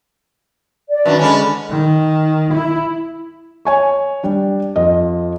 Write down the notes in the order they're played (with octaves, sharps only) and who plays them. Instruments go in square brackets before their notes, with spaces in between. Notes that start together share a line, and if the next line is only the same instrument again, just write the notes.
[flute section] D5
[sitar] F#2 D#3 D4 [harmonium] F#4 B4 E5
[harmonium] D3 G#3 [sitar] C#4 D4 D5 [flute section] B5
[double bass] D#3
E4
[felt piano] C#5 G#5 C#6
G3 D4
F2 F3 D#5